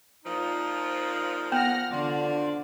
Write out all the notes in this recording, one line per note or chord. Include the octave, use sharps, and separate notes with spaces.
A#2 F3 D#4
B3 F#5 F6 A#6
D3 F4 F#4 C5 D5